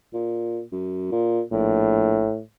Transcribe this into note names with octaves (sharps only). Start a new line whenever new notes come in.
A#2
F#2
A#2
A#1 A2